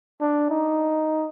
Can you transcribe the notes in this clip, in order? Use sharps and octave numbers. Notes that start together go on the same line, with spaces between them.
D4
D#4